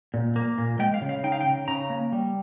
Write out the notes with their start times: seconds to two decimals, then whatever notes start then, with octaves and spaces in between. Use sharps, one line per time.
0.14 A#2
0.36 A#3
0.58 A#2
0.79 G#3 G5
0.94 F5
1.02 C#3
1.09 F5
1.24 D#4 G5
1.32 F5
1.41 G5
1.46 C#3
1.68 C#3 A#5
1.90 A#3
2.12 G3